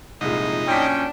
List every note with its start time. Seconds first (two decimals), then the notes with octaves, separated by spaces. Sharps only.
0.21 C2 F2 A#2 G#3 D#4 E4
0.67 F#2 A#2 C#4 D4 G5 B6